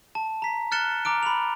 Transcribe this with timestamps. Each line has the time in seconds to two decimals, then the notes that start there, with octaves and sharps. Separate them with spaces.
0.15 A5
0.42 A#5 B6
0.72 F6 F#6 A6 C#7 E7 G7
1.05 A#5 D6 F6 D7
1.23 B5 F7